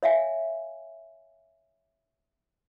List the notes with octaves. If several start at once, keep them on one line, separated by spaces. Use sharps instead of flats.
C#5 E5 F5 G#5